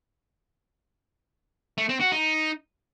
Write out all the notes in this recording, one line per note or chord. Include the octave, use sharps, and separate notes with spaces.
A3
C4
F#4
D#4